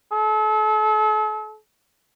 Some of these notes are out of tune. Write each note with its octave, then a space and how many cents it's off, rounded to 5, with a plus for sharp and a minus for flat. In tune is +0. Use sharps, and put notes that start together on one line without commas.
A4 -40